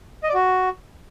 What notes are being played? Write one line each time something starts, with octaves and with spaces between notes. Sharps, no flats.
D#5
D5
F#4